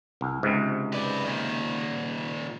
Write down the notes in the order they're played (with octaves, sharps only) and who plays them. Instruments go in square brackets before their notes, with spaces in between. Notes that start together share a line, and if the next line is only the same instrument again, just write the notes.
[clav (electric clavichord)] C2
C#2 G#2 C3
[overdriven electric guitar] B4 D5
A#2 D#3